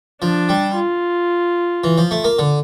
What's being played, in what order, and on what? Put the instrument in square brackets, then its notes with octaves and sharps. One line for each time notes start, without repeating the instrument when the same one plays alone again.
[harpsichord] F3 [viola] D4
[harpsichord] G3
[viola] F4
[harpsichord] E3
F3
A3
A#3
D3